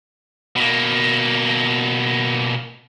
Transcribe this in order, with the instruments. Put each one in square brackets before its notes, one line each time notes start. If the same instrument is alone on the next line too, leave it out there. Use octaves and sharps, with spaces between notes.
[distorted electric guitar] B2 A#3